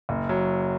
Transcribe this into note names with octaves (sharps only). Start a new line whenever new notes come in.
F#1
F#3